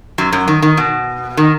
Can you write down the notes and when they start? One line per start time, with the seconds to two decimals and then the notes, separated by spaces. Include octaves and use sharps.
0.18 F#2 F#3
0.32 F#2 F#3
0.47 D#3
0.62 D#3
0.77 B2
1.37 D#3